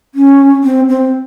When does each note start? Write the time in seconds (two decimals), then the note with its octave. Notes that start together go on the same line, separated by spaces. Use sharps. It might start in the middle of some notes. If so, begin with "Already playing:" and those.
0.15 C#4
0.64 C4
0.89 C4